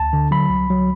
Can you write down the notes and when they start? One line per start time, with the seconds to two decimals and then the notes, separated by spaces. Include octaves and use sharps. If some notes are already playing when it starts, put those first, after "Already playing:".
Already playing: D2 A5
0.13 D3
0.31 F#3 B5
0.50 C2
0.70 F#3